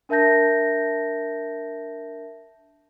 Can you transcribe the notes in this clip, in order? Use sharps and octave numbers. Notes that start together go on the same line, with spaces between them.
D4 A#4 E5 A5 G6 A#6